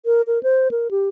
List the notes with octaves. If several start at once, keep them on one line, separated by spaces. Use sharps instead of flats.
A#4
A#4
C5
A#4
G4